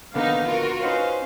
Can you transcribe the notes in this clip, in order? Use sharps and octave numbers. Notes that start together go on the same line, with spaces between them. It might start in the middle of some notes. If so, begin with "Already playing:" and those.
A#1 D3 D#3 B3 D#4 F5
F4 F#4 A#4
C#4 D#4 B4 C5 F5